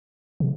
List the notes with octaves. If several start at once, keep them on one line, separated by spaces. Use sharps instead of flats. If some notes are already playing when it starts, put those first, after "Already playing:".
C3